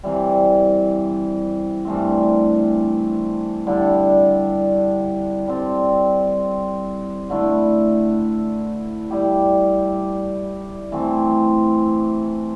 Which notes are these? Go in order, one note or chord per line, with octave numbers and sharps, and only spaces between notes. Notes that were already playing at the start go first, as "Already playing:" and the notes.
C3 E3 G3
G2 E3 A3 C4
D3 G3 E4 A4
G3 C4 A4
D3 A3 E4
G3 E4 G4
E3 A3 C4